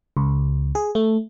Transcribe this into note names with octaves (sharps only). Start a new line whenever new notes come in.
C#2
G#4
A3